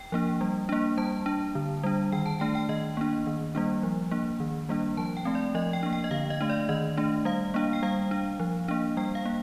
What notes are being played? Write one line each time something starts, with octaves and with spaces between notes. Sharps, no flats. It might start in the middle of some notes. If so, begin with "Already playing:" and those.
Already playing: G5
F3 A#3 D4
G3
A#3 D4
G3 A5
D4
D3
G3 D4
D#3 G5
A5
A3 D4 G5
G5
D#3 D#5
A#3 D4
D#3
G3 A#3 D4
F3
A#3 D4
D#3
G3 A#3 D4
F3 A5
G5
A3 C4
D5
F3 D#5
G5
A#3 D4
G5
D#5
D3 F5
D#5
A3 D4
D5
D#3 D#5
A3 D4
G3 F5
A#3 D4
G5
G3 F5
D4
F3
A#3 D4
G3 G5
F5
A#3